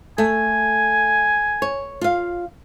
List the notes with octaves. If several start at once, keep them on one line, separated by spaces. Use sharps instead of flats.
A3 G#5
C#5
F4 F5